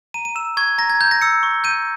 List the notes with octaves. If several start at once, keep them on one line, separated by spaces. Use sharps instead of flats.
A#5 D#7
D#7
E6 E7
C#6 G#6
A#5 A#6
G#6
A#5 G6
A#6
E6 C#7
C#6
G6 D#7